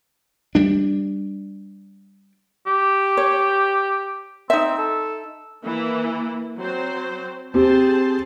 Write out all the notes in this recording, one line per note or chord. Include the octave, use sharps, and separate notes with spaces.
G3 D4
G4
C#5
C4 D#4 E5
A4
E3 A#3
F#3 C4 C5
C4 G4 G#4 C5 A5